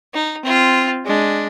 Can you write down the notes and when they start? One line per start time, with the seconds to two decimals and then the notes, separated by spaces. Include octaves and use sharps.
0.14 D#4
0.45 C4 F4
1.06 G#3 D4